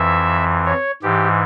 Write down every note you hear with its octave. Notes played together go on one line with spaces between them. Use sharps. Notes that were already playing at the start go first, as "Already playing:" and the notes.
Already playing: F2 E3 E5
C#5
G#2 E3 G4